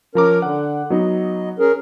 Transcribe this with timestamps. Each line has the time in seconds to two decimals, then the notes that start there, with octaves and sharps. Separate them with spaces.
0.15 F3 C#4 A#4 A#5 D6
0.42 D3 F#5
0.90 F#3 B3 D#4 D#5
1.59 C#4 G#4 A#4